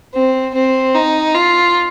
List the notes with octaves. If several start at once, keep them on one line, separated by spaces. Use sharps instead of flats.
C4
C4
D#4
F4